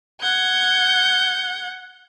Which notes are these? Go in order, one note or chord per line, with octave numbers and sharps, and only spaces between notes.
F#5 G6 G#6